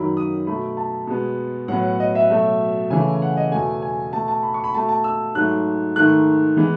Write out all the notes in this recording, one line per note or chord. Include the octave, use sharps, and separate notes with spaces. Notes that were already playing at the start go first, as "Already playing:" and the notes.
Already playing: F#2 D#3 F#3 B5
D#6
B2 A3 B5
A5
B2 G#3 B3
A2 F#3 B3 F#5
D#5
E5
B2 F#3 A3
C#3 E3 A3 G#5
F#5
D#5
E2 B2 A3 G#5
G#5
B2 A3 A5
A5
B5
C#6
B5
B2 A3 A5
A5
E6
G#2 F#3 A3 F#6
G#2 D#3 A3 F#6
E3 G#3 B3